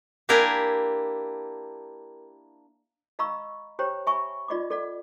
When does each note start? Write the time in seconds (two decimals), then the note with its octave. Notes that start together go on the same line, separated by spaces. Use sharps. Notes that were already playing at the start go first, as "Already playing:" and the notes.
0.29 A#3 D4 E4 G4 A#4 G#5
3.19 D#5 F5 A#5 B5 C#6 E6
3.79 G4 C5 C#5 G5 A#5
4.07 E5 G#5 B5 C#6
4.48 F4 D5 D#5 B5 D6
4.70 A4 D5 F#5